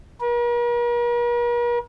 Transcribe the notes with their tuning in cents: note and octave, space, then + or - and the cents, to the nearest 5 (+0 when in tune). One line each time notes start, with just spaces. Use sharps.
A#4 +45